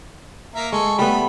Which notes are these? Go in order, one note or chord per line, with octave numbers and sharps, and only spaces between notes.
A#3 A#4 E5
G#3 A4 C#6
G3 A3 B3 B5